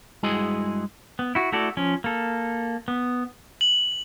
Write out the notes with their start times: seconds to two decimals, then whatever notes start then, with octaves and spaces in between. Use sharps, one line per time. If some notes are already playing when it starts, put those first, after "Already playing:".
0.23 G2 G#3 E4 F#4 G#4 D#5
1.19 B3
1.35 E4 F#4
1.52 A3 E4 F#4 A4 D5
1.77 F3 C#4
2.04 A#3 A4
2.88 B3
3.61 F#7